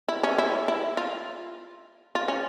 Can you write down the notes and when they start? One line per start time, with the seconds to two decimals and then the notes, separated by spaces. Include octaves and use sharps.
0.08 E4
0.23 C#4
0.38 E4
0.68 E4
0.97 F4
2.15 F4
2.28 C#4